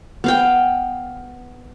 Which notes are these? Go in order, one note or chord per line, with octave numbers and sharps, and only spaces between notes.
B3 F5 G5